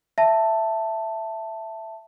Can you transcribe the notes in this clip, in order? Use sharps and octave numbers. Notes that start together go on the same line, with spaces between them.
E5 A5